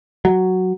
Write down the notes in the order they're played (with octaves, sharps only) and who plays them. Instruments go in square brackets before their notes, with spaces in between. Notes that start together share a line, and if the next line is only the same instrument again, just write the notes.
[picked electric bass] F#3